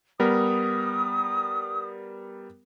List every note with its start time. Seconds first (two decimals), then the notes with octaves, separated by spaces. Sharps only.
0.20 G3 B3 A#4 D#6